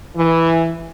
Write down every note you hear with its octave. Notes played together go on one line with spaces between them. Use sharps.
E3